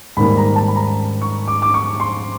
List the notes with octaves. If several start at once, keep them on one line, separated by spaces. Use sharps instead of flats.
G#2 D#3 G3 A#3 B5
A#5
A5
B5
A#5
C#6
D6
D6
C#6
C6